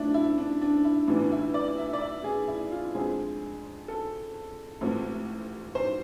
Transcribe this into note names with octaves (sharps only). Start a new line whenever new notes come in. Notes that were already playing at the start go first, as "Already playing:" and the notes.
Already playing: D2 F3 A3 D4 E4
E4
D4
D4
E4
A1 A2 E3 B3 D4
E4
D5
E5
D5
E5
G#4
E4
F4
F2 D3 G#3 C4 G#4
A4
A1 G#2 F3 A3 C4
C5